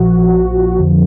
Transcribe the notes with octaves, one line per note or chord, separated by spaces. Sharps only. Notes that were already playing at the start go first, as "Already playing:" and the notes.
Already playing: A#1 A#2 F3 F#4
A#1 A#2 F3
F2 D3 F3